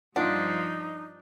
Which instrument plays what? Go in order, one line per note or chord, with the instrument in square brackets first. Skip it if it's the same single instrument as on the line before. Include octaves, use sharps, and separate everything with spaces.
[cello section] G2 F3 [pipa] D4 [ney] D#4 [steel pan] F4 F#5